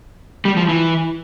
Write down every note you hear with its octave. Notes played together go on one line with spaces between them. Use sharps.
G3
F3
E3